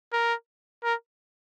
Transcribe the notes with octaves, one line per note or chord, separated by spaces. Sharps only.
A#4
A#4